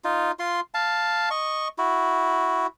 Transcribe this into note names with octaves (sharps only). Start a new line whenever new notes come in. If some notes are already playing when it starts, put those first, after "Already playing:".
D#4 F4
F4 C6
F5 A5
D#5 C#6
E4 F#4